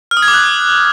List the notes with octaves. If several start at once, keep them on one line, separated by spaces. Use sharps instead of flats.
F6
D#6
G#6
D6
F#6